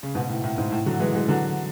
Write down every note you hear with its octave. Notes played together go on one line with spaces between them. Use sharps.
C#3
G#2 B2
A2
A2
G#2
A2
D3 F#3
E3 G#3
E3 G#3
D3 F#3